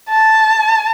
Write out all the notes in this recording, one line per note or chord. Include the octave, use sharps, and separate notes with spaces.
A5